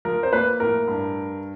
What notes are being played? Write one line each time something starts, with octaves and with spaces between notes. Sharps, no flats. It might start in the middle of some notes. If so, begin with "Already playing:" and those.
F3 A#4
C5
A#3 B4
A2 A#4
G2